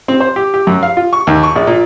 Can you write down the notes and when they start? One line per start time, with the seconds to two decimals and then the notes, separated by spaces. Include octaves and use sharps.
0.08 C4
0.20 C5
0.36 G4
0.54 G4
0.67 F#2
0.83 F5
0.97 F4
1.13 C#6
1.27 D#2
1.43 C#6
1.55 A#1
1.67 A#2